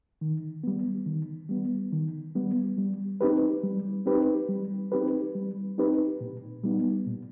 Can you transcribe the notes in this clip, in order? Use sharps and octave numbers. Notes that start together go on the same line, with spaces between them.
D#3
G3 B3
D#3
G3 B3
D#3
G3 B3
G3
C4 D#4 G4 B4
G3
C4 D#4 G4 B4
G3
C4 D#4 G4 B4
G3
C4 D#4 G4 B4
A#2
G3 B3 D#4
A#2